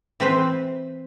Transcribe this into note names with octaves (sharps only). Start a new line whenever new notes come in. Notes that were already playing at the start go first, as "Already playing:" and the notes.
E3 C4 B4 C5